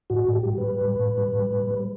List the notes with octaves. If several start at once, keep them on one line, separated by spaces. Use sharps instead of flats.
A2 F#4
A2 G4
G3
B4
G3
A2
A2
G3
A2
G3
G3